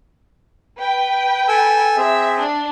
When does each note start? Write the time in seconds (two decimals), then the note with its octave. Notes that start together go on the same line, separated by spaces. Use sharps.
0.78 B4 G5
1.48 A4 G#5 E6
1.97 C4 G#4 E5
2.40 D4